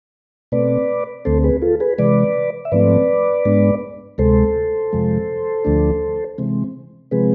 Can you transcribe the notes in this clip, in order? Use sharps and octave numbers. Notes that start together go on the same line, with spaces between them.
B2 A3 C4 B4 D5
D2 D3 A3 C4 A4 C5
G#4 B4
F4 A4
G#4 B4
C3 E3 G#3 B4 D5
E5
G#2 F3 A3 C4 B4 D5
G#2 G#3 B3 D4
D2 C3 G#3 A4 C5
F2 C3 F3 G#3
D2 D3 F3 A3 D4
C3 E3 G#3 C4
C3 F3 G#3 C4 G#4 B4